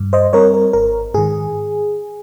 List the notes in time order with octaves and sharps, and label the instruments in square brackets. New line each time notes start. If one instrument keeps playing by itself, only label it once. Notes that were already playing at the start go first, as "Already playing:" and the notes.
Already playing: [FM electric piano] G2
C5 D#5
G3 C4 A#4 C#5
A#4
G#1 A#4
G#2 D#3 G#4